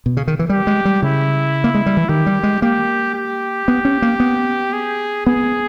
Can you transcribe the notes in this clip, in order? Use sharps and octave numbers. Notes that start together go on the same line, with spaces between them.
B2
C#3
D#3
E3
G3 G4
G#3
G3
C#3 E4
A#3
G#3
G3
E3
D#3 G4
G3
G#3
A#3 G4
G4
B3
C#4
A#3
B3
G#4
B3 G#4